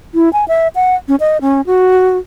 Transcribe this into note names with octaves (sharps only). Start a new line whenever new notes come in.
E4
G#5
E5
F#5
C#4
D#5
C#4
F#4